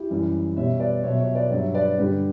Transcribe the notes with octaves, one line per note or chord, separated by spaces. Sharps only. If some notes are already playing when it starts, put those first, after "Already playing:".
Already playing: E4 G4
F#2 E3 G3
B2 G3 C#5 E5
B4 D5
B2 F#3 C#5 E5
C#5 E5
B4 D5
G2 F#3 C#5 E5
B4 D5
G2 D3 G3 G4 B4